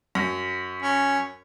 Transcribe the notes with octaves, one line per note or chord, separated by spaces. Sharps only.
F#2
C#4